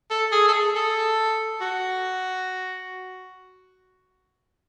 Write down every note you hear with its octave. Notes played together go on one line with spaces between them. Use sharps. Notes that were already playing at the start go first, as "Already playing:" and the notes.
A4
G#4
A4
G#4
A4
F#4